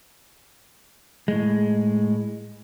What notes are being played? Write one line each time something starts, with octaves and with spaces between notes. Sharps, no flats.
A2 G#3